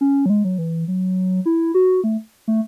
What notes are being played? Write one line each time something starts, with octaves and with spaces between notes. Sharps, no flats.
C#4
F#3
G#3
F#3
E3
F#3
E4
F#4
A3
A3